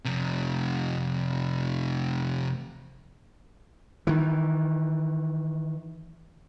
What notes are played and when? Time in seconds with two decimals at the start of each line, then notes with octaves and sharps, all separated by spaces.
0.05 F2 C3
4.07 D#3 E3